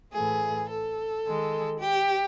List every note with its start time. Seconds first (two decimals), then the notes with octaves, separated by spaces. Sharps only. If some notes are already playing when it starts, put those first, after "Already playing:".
0.13 A2 E3 A3 G#4
0.68 A4
1.24 D#3 G#3
1.80 G4